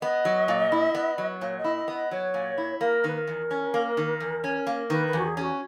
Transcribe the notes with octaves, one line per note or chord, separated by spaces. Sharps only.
B3 D#5
F#3
A#2
E4
B3
F#3
A#2 C#5
D#5
E4
D#5
B3
D#5
F#3 C#5
A#2
E4
A#3 A#4
D#3 B4
A#4
E2
C#4
A#3
D#3
E2
C#4
A#3
D#3 B4
B4
E2
F#4
G#4
C#4 G#4
F#4